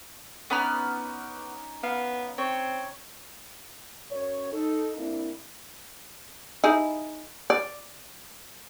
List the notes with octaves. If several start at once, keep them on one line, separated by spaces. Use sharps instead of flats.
B3 C#4 D#4 B5 D6 F6
B3 F5
C4 C#5
F#2 C#5
D#4 A4
A#3 C4 D4 E4
D#4 E4 G#4
D5